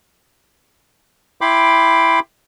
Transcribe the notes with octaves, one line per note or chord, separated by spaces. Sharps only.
E4 G5 B5 C6 D6